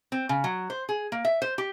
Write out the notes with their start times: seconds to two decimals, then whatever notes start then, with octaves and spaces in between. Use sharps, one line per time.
0.12 C4
0.29 C#3
0.44 F#3
0.70 C5
0.89 G#4
1.12 A#3
1.25 E5
1.42 C5
1.58 G4